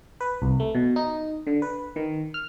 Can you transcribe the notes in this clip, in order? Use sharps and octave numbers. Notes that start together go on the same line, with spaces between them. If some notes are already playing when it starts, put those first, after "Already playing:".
B4
C2
A3
B2
D#4
D3
B4
D#3
F6